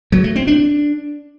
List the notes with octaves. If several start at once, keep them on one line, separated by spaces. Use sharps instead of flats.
F#3
A3
C4
D4